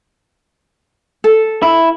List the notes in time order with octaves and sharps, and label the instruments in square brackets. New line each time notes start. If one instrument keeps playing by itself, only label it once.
[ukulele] A4
[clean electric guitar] E4